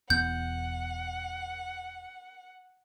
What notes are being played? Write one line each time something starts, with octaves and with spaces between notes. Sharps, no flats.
E1 E2 B3 F#5 G6